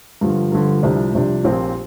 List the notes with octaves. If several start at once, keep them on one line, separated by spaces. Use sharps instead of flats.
G2 D3 F3
G2 D3 F3
C2 C3 F3 D4
C2 C3 F3 D4
A#1 A#2 F3 C4 G4